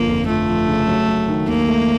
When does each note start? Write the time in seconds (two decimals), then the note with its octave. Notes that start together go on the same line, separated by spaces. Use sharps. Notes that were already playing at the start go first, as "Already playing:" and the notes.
Already playing: G1 F3 A#3
0.08 F2
0.28 F3 A3
0.49 F3
0.68 C#3
0.88 F#3
1.09 F#3
1.28 D#3
1.48 D#2 A#3
1.68 A3